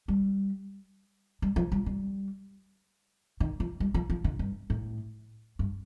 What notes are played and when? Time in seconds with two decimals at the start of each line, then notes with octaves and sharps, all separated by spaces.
0.08 G3
1.42 G3
1.56 F3
1.72 G3
1.86 G3
3.40 D#3
3.60 F3
3.80 G3
3.94 F3
4.10 F3
4.24 D3
4.39 G2
4.70 A2
5.59 G2